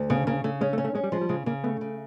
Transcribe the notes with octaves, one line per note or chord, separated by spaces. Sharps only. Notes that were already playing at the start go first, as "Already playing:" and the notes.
Already playing: D2
C#3 B3
C#3 A#3
C#3 A3
G#3 C#4
A3
C#4
A3
G#3 C#4
G3
F3 G#3
G3
C#3 G#3
C#3 A#3
A3 B3
C#3